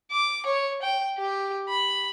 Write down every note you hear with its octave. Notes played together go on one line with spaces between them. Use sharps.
D6
C#5
G5
G4
B5